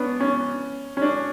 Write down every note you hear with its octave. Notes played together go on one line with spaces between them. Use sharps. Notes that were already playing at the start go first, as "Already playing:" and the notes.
Already playing: B3 C#4 D4
C#4
C#4
D4